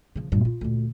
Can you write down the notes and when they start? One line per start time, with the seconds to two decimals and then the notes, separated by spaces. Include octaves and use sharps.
0.15 C#3 F3
0.32 G2 A#2
0.45 F4
0.61 D2 A#2